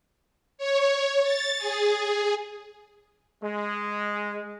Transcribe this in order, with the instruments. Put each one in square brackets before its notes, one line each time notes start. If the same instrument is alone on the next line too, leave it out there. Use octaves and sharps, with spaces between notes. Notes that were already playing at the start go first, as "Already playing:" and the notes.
[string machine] C#5
A6
G#4
[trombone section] G#3